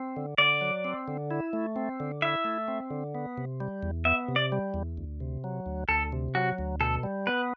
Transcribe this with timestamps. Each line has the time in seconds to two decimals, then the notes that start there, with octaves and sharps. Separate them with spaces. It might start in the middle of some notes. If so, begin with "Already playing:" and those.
Already playing: C4
0.16 D3
0.38 D3 D5
0.61 F#3
0.85 C4
1.08 D3
1.31 E4
1.53 A3
1.76 C4
2.00 D3
2.22 E4 E5
2.45 A3
2.68 C4
2.90 D3
3.15 B3
3.38 C3
3.60 G3
3.83 E2
4.05 B3 E5
4.28 C3
4.36 D5
4.52 G3
4.74 E2
4.97 D2
5.20 C3
5.44 F#3
5.66 D2
5.89 D2 A4
6.12 C3
6.35 F#3 F#4
6.58 D2
6.80 B2 A4
7.03 G3
7.27 B3 B4